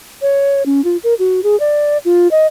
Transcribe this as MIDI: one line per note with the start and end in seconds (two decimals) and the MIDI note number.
0.22 0.63 73
0.66 0.83 61
0.84 0.97 65
1.04 1.14 70
1.19 1.40 66
1.44 1.58 68
1.60 1.98 74
2.05 2.28 65
2.31 2.47 75